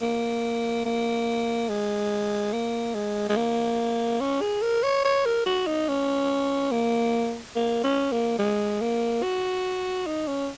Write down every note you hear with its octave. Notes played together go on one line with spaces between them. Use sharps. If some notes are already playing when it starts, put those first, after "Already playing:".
A#3
A#3
G#3
A#3
G#3
G#3
A#3
C#4
G#4
A#4
C#5
C#5
A#4
F#4
D#4
C#4
A#3
A#3
C#4
A#3
G#3
A#3
F#4
D#4
C#4